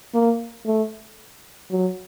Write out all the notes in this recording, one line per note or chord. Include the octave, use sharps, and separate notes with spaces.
A#3
A3
F#3